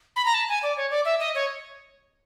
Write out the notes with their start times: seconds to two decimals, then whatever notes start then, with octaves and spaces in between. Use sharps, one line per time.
0.16 B5
0.26 A#5
0.34 A5
0.49 G#5
0.63 D5
0.77 C#5
0.91 D5
1.05 E5
1.19 D#5
1.35 C#5